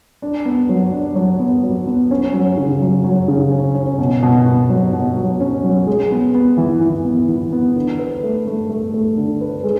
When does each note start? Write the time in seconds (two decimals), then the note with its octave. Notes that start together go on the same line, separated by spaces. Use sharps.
0.22 D4
0.45 B3
0.69 F#3
0.92 D4
1.15 F#3
1.39 B3
1.64 F#3
1.87 B3
2.11 C#4
2.34 F#3
2.57 C#3
2.82 F#3
3.04 F#3
3.28 C#3
3.51 C#4
3.75 C#4
3.98 B2
4.23 B2
4.46 B2
4.70 F#3
4.93 B2
5.17 F#3
5.40 C#4
5.64 F#3
5.87 G#3
6.11 B3
6.34 B3
6.58 E3
6.81 E3
7.05 B3
7.28 E3
7.52 B3
7.76 D3
7.99 B4
8.23 A3
8.47 A3
8.70 A3
8.94 A3
9.17 D3
9.41 B4
9.64 G#3